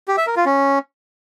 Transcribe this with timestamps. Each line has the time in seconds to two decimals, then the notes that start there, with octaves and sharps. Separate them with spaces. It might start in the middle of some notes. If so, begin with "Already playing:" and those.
0.08 G4
0.17 E5
0.27 A#4
0.36 F4
0.46 C#4